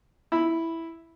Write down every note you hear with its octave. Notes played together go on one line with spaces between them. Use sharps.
E4 B5